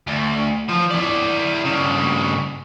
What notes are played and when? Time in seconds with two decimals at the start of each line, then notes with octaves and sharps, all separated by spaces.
0.07 D2
0.69 F3
0.91 E4 D5
1.66 G2 C#3